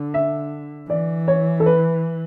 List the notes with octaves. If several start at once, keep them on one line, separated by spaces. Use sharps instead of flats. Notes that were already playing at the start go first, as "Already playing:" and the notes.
Already playing: D3
E5
E3 D5
C#5
A4
B4